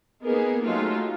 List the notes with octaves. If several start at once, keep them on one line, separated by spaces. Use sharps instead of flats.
A#3 B3 D#4 G#4 A#4
F#3 G#3 A3 D#4 F4 G4